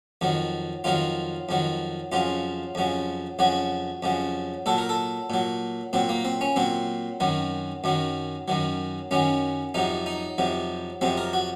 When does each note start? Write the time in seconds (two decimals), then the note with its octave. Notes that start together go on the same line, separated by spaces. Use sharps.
0.21 F2 D#3 F#3
0.84 F2 D#3 F#3 F4
1.49 F2 D#3 F#3
2.12 F2 C#3 F#3 F4
2.75 F2 C#3 F#3
3.39 F2 C#3 F#3 F#4
4.03 F2 C#3 F#3
4.66 A#2 F#3 A4
4.78 A#4
4.89 A4
5.30 A#2 F#3
5.93 A#2 F#3 C4
6.09 A#3
6.25 C4
6.41 C#4
6.56 A#2 F#3 C4
7.20 F#2 D#3 F#3
7.84 F#2 D#3 F#3
8.48 F#2 D#3 F#3
9.11 F#2 D#3 F#3 C#4
9.74 F2 C3 F#3 D#4
10.06 D#4
10.38 F2 C3 F#3
11.01 F2 C3 F#3 C4
11.17 A#4
11.33 F#4